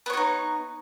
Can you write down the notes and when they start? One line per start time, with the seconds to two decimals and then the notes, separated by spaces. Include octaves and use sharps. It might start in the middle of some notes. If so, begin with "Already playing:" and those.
0.06 B3
0.10 C#5
0.13 F#4
0.17 D#4